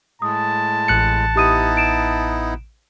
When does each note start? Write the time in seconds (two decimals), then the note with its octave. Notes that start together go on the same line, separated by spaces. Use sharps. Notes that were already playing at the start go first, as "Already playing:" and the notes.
0.22 A2 G#3 A5 D#6
0.88 A1 F#6 C#7
1.36 B3 D#4 E4 G4 D#6 D#7
1.77 D7 E7